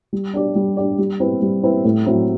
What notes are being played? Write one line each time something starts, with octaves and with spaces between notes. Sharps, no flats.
G3
D4 G4 D5
G3
D4 G4 D5
G3
C4 E4 B4
G3
C4 E4 B4
A2
F#3 C4 E4